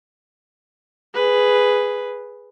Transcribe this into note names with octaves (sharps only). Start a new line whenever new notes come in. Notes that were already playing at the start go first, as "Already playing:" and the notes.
G#4 B4